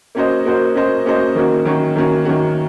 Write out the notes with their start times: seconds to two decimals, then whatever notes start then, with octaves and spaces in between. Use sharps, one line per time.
0.15 A#3 C#4 F#4 C5 D#5
0.45 A#3 C#4 F#4 C5 D#5
0.75 A#3 C#4 F#4 C5 D#5
1.05 A#3 C#4 F#4 C5 D#5
1.35 D#3 A#3 C#4 F#4
1.65 D#3 A#3 C#4 F#4
1.96 D#3 A#3 C#4 F#4
2.25 D#3 A#3 C#4 F#4